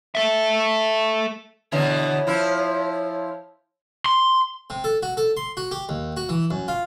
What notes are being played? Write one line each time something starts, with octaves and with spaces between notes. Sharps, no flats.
A4 E5
B2 D3 E3 C#5
F3 E4
C6
C3
A4
F#4
A4
C6
F#4
G4
D#2
F#4
E3
F#2
F4